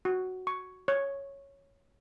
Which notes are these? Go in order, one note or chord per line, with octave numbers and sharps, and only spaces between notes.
F#4
C#6
C#5